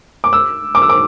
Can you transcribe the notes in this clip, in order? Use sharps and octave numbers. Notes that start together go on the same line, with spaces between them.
D6
E6
D6
E6
D6